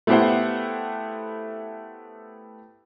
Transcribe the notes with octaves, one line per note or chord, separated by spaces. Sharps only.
A3 B3 E4 G4 C5 F#5